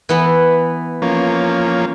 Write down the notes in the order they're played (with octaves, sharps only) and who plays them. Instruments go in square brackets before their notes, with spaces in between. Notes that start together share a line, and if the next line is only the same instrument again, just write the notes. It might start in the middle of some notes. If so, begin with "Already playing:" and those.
[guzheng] E3 B3
[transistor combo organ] F3 A#3 C#4